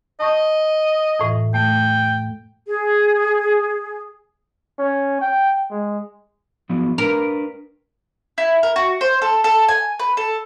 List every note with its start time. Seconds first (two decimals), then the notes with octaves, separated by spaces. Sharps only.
0.20 D#5 A5 C#6 G6
1.19 F2 A2 E3
1.54 A3 G5
2.67 G#4
4.79 C#4
5.21 G5
5.71 G#3
6.69 F3 F#3 B3
6.98 D4 A#4 B4
8.38 E4
8.63 A#4
8.76 F#4
9.01 C5
9.22 A4
9.44 A4
9.69 G#5
9.99 B4
10.17 A4